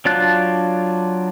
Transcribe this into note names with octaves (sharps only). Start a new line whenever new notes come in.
F#3 D4 F4 A5 F#6